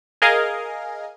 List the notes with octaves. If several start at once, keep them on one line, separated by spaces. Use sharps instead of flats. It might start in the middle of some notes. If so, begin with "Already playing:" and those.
G#4 A#4 D#5 F5 G#5